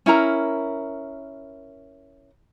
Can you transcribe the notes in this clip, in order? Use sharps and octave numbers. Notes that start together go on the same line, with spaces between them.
C#4 E4 A#4 A#5